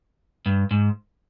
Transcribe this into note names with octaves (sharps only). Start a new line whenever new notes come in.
G2
G#2